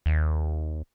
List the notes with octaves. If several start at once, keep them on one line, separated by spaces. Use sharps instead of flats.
D#2